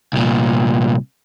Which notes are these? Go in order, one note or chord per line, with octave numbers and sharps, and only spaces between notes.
C2 A#2